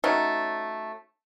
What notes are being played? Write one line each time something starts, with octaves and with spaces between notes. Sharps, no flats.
F#3 A3 C#4 D#4